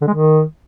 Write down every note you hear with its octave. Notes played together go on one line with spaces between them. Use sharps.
D3
G#3
D#3